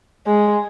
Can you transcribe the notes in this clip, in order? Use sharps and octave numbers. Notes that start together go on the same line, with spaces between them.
G#3